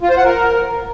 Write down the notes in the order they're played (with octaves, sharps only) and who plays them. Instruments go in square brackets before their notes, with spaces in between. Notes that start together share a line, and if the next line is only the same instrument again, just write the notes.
[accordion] F4
C5
F#5
A#4